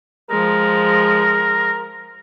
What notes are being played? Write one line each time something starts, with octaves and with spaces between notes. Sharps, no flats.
F3 G#3 A#4